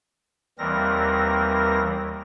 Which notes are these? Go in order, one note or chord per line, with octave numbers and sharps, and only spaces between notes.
D#2 E3 G3 C4 A#4 A#6